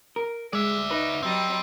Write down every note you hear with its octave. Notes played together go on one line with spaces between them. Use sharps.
A#4
G#3 D5 E5
D#4 B4
F#3 G3 C4 D#5